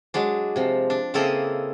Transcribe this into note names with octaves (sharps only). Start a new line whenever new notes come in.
F#3 G#3 D4
C3 F3
D4
C#3 A#3 C4 E4 A4 D#5